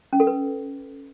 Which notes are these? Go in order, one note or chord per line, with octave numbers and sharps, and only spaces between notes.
C#4
A4
B4